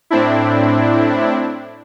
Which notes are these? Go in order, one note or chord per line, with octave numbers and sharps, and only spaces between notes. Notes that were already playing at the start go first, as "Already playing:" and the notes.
A2 C4 D4 E4